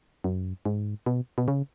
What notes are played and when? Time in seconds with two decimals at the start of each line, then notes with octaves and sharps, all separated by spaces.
0.24 F#2
0.65 G#2
1.06 B2
1.38 B2
1.48 C#3